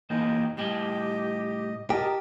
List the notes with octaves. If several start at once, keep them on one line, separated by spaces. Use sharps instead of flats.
E3 A#3 D#4 D#5 G5
A2 G3 G4 D#5 G5
G4 A#4 D#5 A5